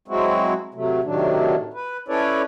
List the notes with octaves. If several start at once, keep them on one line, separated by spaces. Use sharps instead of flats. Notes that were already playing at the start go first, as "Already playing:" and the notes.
F#3 G#3 C4 E4 F#4
C3 F#3 A3
A2 C3 D#3 F#3 D4
B4
C#4 E4 A4 B4 C#5 D5